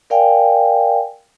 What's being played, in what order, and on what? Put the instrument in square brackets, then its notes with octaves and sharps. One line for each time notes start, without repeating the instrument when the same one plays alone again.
[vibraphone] A#4 D5 F5 G5 G#5